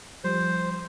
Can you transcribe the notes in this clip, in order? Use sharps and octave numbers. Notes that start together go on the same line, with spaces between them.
F3 G3 C5